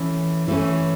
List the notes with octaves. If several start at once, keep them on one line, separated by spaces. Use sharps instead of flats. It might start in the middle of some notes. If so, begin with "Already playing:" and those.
Already playing: E3 A3 C#4
E3 A3 C#4